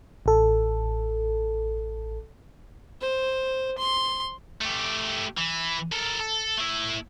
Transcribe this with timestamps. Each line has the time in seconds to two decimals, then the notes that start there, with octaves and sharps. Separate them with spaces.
0.26 A1 A4
3.01 C5
3.78 C6
4.61 A3 G4
5.37 E3
5.92 A4 A#4
6.20 A4
6.57 A3 E4